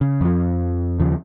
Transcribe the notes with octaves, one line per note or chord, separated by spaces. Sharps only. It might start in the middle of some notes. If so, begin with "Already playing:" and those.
C#3
F2 F3
D#2 C#3 F3